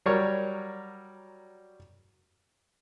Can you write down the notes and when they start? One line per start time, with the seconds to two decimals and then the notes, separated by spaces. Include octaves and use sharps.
0.06 F#3 G3 A#4 C#5